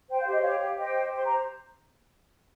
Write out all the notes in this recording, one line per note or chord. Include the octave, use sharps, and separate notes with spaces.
C5 G5
F5
G4 D#5
G4 C#5 F5
G4
C5 D#5 G5
G4
C5 C6
C5 A#5